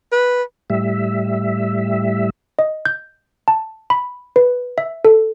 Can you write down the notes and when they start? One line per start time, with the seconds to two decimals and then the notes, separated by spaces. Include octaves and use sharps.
0.12 B4
0.70 A2 G3 E5
2.59 D#5
2.85 G6
3.48 A5
3.90 B5
4.36 B4
4.78 E5
5.05 A4